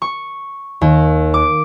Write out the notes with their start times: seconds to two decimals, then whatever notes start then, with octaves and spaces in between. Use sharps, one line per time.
0.02 C#6
0.81 D#2
1.34 D6